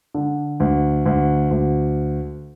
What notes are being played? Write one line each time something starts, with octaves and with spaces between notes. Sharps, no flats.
D3
D2
D2
D2